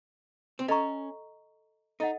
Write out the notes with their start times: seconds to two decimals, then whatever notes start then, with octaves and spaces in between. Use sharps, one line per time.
0.59 C4
0.68 C#4 A4 D#5 A#5 C#6
2.00 D#4 A4 D#5 F#5